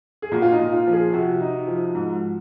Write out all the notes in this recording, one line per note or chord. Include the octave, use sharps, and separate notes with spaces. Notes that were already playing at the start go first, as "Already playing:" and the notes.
G#4
A#2 F#4
F4
D#4
A#2
F4
F3
G#4
C3 F#4
D#4
F3
G#2